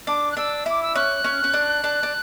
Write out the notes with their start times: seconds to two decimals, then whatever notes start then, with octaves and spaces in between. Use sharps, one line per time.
0.07 D4 D6
0.31 F#6
0.37 D4 E6
0.66 E4 D6
0.82 E6
0.95 C#4 F#6
1.24 C#4
1.44 C#4
1.54 D4
1.84 D4
2.03 D4